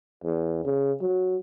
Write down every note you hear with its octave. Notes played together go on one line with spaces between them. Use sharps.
E2
C#3
F#3